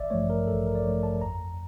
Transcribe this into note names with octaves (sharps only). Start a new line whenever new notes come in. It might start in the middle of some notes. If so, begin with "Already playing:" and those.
Already playing: A1 D5 E5
G2 F3 A3 C#5
A#4
A1 A4
A#4
D5
G2 F3 A3 C#5
A5
F2 A#5